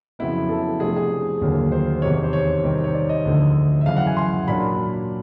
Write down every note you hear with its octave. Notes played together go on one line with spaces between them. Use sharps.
F2 C#3 F#3 B3 E4
A4
C3 F3 A3 D4 G#4
G#4
D#2 D3 F#3 A#3
C5
E2 C3 D#3 C#5
C#5
C5
C#5
C3 D#3 G3 C4
C#5
D5
D#5
D2 D3 F3
E5
F#2 C#3 E3 F5
F#5
G#5
C6
A#2 F#3 A#3 D4 B5